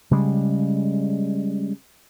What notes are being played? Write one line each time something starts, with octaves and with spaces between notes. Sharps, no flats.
C#3 G3 G#3